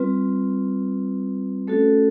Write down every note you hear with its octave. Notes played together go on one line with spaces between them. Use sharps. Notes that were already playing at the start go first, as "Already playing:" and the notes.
Already playing: G3 C4 F4 B4
A3 C#4 F#4 A4